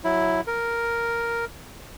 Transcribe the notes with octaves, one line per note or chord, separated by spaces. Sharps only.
F#3 E4
A#4